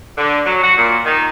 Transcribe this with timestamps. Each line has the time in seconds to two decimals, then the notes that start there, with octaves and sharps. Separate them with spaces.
0.17 D3
0.46 F#3
0.63 F#4
0.77 A#2
1.05 D#3